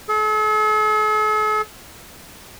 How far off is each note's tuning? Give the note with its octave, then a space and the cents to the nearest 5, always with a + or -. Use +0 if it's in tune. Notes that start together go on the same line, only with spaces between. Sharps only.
A4 -45